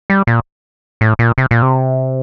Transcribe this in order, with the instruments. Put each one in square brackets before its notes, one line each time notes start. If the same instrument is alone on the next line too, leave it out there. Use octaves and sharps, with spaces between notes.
[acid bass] G3
A#2
A2
A#2
C3
A#2
C3